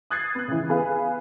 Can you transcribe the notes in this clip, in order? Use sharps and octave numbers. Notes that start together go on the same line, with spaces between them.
D#6 F#6 G#6 A6 C7
B3 F#6
C#3 E3
B3 G#4 B4 F5 F#6